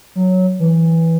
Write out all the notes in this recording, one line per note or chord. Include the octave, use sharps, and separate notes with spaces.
F#3
E3